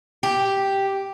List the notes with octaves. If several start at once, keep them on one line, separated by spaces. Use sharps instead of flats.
G4